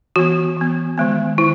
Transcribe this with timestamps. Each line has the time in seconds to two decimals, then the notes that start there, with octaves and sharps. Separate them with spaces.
0.16 E3 B3 F#4
0.57 E3 B3
0.97 D#3 G#3 B3
1.38 D#3 E4